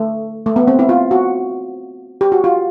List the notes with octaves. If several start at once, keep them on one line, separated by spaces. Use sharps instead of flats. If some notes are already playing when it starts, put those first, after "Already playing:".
Already playing: A3
A3
B3
C4
E4
F4
F#4
G4
F#4
F4